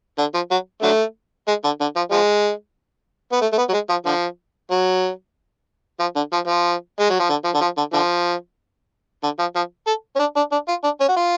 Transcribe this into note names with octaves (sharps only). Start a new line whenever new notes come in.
D3
F3
F#3
D3 F#3 A3
G#3
D3
D3
F3
F3 G#3
B3
A3
A3
B3
F#3
G#3
F3
D3 F3
F#3
F3
D3
F3
F3
G#3
F#3
F3
D3
F3
D3
F3
D3
D3 F3
D3
F3
F3
A4
C#4
D4
D4
D4
F4
D4
C#4
F#4
F4